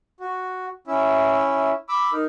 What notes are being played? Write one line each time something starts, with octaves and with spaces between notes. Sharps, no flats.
F#4
C#4 E4 E5
B5 D6 E6
D#4 A#4